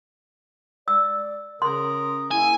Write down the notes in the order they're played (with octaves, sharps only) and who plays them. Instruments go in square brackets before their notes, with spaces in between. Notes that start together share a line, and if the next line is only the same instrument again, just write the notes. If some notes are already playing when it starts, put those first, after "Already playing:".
[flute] D5 [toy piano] E6
[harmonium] C#3 A#4 [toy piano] C6 [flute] D#6
[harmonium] A#3 [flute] E4 [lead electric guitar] G#5